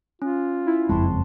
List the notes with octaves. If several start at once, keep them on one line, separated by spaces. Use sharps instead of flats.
C#4 F4
E4
F#1 F2 G#3 C4 A5 C6